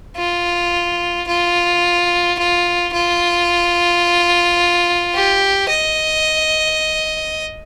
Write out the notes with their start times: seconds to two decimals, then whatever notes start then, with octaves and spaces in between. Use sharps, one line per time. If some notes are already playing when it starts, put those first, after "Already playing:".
0.17 F4
1.27 F4
2.38 F4
2.93 F4
5.14 G4
5.69 D#5